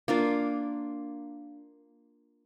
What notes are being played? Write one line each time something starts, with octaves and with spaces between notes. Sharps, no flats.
A#3 D4 F4